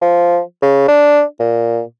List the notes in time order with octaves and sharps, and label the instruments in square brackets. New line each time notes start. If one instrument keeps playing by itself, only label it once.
[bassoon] F3
C#3
D4
A#2